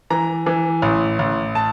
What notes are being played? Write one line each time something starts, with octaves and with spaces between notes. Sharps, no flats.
E3 A#5
E3
A1
A1
A5